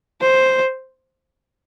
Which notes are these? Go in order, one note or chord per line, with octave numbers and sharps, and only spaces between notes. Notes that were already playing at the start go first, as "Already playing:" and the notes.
C5